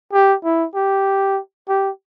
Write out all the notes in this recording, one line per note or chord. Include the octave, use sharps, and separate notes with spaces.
G4
E4
G4
G4